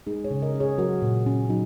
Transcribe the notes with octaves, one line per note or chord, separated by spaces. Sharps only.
G#3 D#4 G#4
G#4 C#5
C#3
A#4 D#5
C#4
G#4 C#5
F#3 F#4 A#4
A#2
C#4
F#3 D#4